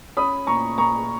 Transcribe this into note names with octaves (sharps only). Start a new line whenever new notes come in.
C#4 B5 D#6
A#2 A#5 C#6
A#2 A#5 C#6